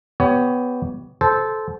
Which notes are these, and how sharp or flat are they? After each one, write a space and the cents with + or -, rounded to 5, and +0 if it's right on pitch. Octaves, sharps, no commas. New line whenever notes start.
B3 +10 G4 +0 C#5 +20
A4 -15 C5 -5